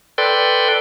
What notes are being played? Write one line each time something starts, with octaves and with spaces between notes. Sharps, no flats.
A4 B4 D5 G5 C6